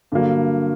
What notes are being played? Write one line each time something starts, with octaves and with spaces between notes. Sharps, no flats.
G2 D3 F#3 A#3